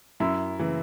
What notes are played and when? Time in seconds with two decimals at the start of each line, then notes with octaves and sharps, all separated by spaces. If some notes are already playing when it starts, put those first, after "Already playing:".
0.20 F#2 E4
0.59 C#3 E3